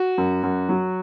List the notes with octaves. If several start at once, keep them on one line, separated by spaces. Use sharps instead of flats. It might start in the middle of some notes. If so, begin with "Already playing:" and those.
Already playing: F#4
F#2
F#2
F#3